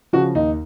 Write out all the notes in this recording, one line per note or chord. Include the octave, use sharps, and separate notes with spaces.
C#3 F3 F#4
D#2 D#4